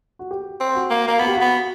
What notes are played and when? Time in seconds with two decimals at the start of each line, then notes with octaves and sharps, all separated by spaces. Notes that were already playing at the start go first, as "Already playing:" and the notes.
0.19 F#4
0.31 G4
0.60 C4
0.75 F#4
0.90 A#3
1.08 A#3
1.19 B3 F#4
1.27 G4
1.35 F#4
1.41 B3